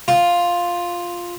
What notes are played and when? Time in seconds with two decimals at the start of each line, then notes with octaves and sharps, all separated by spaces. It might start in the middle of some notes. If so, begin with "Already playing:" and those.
0.08 F4